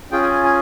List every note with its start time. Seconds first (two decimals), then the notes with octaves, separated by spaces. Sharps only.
0.12 C#4 F4 G#4 G5
0.22 G#5
0.34 G#5
0.44 G#5